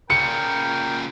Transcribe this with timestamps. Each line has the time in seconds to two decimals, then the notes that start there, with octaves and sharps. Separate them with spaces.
0.10 A#2 C#3 A#4 G5 C#7